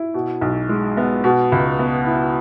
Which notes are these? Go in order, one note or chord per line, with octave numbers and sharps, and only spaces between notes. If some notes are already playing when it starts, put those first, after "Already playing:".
Already playing: E4
B2
B1
G#3
B3
B2
C#2
B3
E4